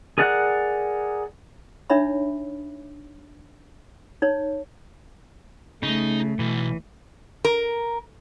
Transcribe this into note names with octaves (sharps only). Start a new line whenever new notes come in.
G#4 A#4 D5 F#5 F#6
D4 D#4 C#5 E5 B5
D#4 C#5
C#3 A3 D#4
B1 E3
A#4